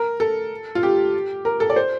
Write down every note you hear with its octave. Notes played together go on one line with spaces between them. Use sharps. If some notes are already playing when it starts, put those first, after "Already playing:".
Already playing: A#4
A4
F4
G4
A#4
A4
D5
C5